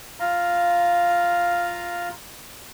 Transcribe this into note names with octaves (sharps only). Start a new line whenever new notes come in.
F4 F5 A#5